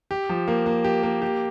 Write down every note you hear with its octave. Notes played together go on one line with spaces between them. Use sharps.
G4
F3
A#3
A#3
G4
A#3
G4